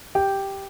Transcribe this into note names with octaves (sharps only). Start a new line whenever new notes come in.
G4 G5